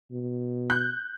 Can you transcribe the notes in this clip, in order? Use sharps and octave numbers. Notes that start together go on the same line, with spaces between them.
B2
F#6 G6